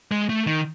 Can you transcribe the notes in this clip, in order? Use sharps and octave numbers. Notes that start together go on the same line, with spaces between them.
G#3
A3
D#3